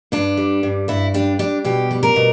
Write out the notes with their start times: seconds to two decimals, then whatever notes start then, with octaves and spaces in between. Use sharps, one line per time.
0.12 G2 D4
0.37 G3
0.63 G2
0.88 G2 E4
1.14 G3 D4
1.39 G3 D4
1.64 B2 G4
1.91 G3
2.03 A#4
2.16 B2